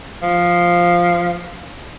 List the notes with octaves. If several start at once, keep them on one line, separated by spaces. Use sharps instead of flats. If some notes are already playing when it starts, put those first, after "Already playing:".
F3